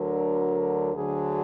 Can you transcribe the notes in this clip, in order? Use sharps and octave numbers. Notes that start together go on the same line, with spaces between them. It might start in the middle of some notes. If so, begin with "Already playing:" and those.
Already playing: D2 D3 F#3 A#4
D2 D3 F#3 G#4